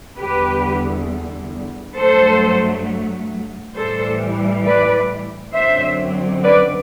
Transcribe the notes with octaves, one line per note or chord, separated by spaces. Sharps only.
E2 D3 G3 G4 B4
G2 F#3 A3 A4 C5
A2 E3 G3 A4 C5
B4 D5
F#2 D3 F#3 C4 C5 E5
B4 D5